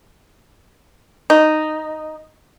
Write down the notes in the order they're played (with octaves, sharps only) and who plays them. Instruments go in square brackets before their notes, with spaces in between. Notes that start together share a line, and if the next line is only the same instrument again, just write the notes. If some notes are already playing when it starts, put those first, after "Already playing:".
[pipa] D#4